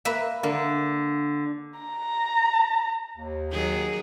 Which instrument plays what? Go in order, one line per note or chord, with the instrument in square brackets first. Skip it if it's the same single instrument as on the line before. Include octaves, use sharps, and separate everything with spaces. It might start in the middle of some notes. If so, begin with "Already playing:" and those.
[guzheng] A#3 B4 E5
[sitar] D3 [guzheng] A#3
[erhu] A#5
[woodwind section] D#2
[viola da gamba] D#3 F#3 G#4